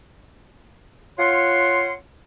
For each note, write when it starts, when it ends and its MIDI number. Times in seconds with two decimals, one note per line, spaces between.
1.18 1.93 65
1.18 1.93 73
1.18 1.93 78
1.18 1.93 84